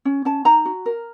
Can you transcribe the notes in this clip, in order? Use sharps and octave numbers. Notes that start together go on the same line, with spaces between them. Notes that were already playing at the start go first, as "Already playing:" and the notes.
C#4
C#4 A5
D#4 A#5
F#4
A#4